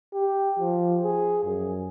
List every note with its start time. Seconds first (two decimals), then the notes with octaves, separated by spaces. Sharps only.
0.14 G4
0.59 F3
1.03 G#4
1.45 F#2